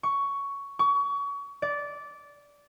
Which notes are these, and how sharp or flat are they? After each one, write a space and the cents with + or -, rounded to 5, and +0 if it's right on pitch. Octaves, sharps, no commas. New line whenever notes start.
C#6 +10
C#6 +30
D5 -15